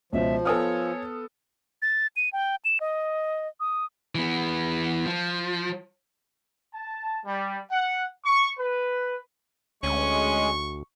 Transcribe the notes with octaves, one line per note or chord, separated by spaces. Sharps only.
C#2 B2 F3 E5
B3 A4 C#5 G#5 D#6 F6
A6
D#7
G5
E7
D#5
D#6
E3 B3
F3
A5
G3
F#5
C#6
B4
D2 G#3 C#4 C#6